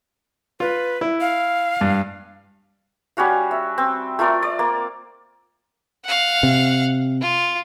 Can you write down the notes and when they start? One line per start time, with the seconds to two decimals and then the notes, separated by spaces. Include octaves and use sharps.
0.60 F4 B4
1.01 E4
1.20 F5
1.81 G2
3.17 G3 C#4 F#4 F5
3.51 E5
3.78 C4
4.19 A3 F4 A#4 D5
4.43 D5
4.59 A#3
6.05 F5 F#5
6.43 C3
7.21 F4